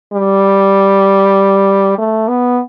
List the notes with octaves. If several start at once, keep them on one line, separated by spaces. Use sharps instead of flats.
G3
A3
B3